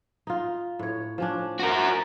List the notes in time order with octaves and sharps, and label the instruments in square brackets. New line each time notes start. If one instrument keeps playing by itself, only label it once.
[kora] D#4 F4
A2 C#5
F3 C#4 D4
[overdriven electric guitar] F#4 A#4